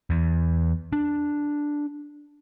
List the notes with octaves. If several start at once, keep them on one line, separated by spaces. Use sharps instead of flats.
E2
D4